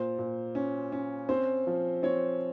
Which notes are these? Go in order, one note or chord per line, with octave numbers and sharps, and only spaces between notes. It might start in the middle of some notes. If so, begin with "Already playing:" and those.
Already playing: A#2 C5
A#2
C#4
C#4
C4 C5
F3
C4 C#5